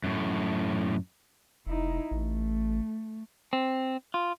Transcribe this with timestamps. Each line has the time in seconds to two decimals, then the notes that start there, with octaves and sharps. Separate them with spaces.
0.04 F#2 A2
1.67 F1 D#4 E4
2.11 A1 A3
3.53 C4
4.14 F4